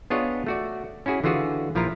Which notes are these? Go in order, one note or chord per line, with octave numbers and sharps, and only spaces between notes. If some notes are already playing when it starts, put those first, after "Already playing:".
B3 D4 F4 G#4 C#5 D#5
A3 F#4 D5
C#4 E4 F#4 G#4
D3 E3 F4 F#4 G#4
A#1 F3 E4 F4 A#4 A#5